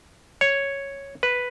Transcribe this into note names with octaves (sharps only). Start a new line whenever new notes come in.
C#5
B4